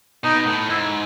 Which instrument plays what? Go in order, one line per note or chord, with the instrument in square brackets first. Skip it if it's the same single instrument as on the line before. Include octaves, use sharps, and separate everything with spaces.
[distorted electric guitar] B2 [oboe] D#4
[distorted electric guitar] A2
[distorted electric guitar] G#2 [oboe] E4